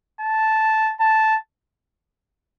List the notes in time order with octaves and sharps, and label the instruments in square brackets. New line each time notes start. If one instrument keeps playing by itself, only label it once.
[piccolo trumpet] A5
A5